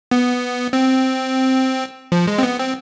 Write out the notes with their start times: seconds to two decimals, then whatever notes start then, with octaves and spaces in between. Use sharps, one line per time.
0.11 B3
0.73 C4
2.12 F3
2.27 G#3
2.38 C4
2.43 B3
2.59 C4